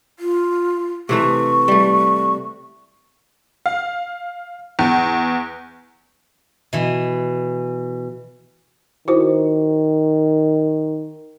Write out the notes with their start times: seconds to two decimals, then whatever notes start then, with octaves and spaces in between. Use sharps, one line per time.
0.19 F4
1.09 C3 E3 A3 C#6
1.68 G3 A3
3.66 F5
4.79 E2
6.73 B2 E3
9.08 D#3 E4 F#4 C5